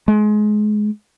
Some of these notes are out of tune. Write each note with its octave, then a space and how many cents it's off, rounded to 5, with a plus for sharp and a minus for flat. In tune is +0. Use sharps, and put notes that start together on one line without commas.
G#3 +25